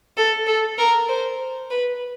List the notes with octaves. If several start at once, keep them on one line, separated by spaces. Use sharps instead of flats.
A4
A4
A#4
C5
B4